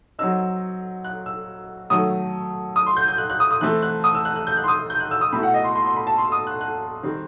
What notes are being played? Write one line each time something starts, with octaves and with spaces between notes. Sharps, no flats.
F#3 C4 D#4 E6
F#6
E6
D#3 F#3 A3 D#6
D#6
C6
G6
G6
F#6
F#6
D#6
D#6
E3 A3 C4 F#6
F#6
D#6
E6
F#6
F#6
G6
F#6
C6
D#6
G6
F#6
E6
D#6
B2 A3 E4 B5
F#5
D#5
C6
C6
C6
B5
A5
C6
D#6
F#6
F#6
D#3 G3 C4